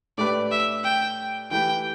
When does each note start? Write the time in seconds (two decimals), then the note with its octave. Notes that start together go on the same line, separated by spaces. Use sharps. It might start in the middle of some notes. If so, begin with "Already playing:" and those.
0.18 A2 A3 D4 G4 B4 D5
0.51 E5
0.84 G5
1.51 E3 A3 G4 B4 G5